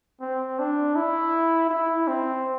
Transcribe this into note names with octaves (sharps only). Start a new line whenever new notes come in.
C4
D4
E4
E4
C4